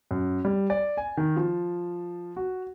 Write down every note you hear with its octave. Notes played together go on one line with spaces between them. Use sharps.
F#2
G3
D5
G#5
D#3
F3
F#4